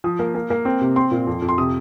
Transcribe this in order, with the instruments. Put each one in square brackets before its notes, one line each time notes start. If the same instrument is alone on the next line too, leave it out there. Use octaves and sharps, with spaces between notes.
[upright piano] F3 D#6
A#3
A#3
A#3
C4
C3
C4 C6
A#2
F2
F2
C6
C3 D#6